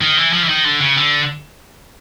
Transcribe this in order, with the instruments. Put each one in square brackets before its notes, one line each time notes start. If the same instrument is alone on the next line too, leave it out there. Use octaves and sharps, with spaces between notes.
[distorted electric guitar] D#3
E3
F3
E3
D#3
D3
C#3
D3